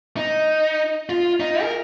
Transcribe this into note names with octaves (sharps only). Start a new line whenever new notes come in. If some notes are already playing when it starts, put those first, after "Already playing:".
D#4
F4
D#4
A#4